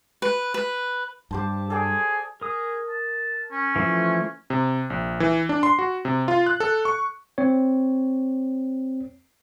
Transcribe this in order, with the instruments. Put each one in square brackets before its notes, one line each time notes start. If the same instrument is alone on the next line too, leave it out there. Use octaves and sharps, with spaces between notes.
[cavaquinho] B4
B4
[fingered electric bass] G2 G3 [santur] G4 C5 A5
[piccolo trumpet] G#4 [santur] A4 D5 G5
[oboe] G#4 [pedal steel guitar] A#4 D#6
[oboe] A5
C#4
[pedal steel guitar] E3 F3 A3
[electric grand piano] C3
A#1
E3
D4
C6
F#4
C3
F4
F#6
A4
C#6
[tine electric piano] C4 C#5